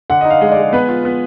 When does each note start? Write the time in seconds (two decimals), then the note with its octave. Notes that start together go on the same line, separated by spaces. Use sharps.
0.10 D3 F#5
0.21 D#4 D#5
0.30 F5
0.41 G#3 D#5
0.52 D5
0.57 G#3
0.73 B3 B4
0.89 F4
1.05 B3